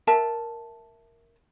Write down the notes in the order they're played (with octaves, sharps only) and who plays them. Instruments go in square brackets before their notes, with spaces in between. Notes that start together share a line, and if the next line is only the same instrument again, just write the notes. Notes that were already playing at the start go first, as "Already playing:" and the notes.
[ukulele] A#4 E5 A5